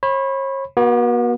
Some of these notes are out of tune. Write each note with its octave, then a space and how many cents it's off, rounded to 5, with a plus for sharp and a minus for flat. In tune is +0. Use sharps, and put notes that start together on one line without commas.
C#5 -40 B5 +0
B3 -45 F#4 +0